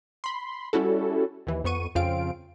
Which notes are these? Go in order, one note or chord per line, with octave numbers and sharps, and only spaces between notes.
B5 C6
G3 C#4 E4 F#4 A4
D#2 E3
F2 B3 C#6 D#7
F2 C#3 C4 F4 F5 D7